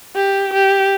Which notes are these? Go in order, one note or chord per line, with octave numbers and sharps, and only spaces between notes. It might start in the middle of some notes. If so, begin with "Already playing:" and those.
G4
G4